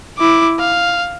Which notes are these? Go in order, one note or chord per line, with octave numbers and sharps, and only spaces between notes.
E4 D6
F5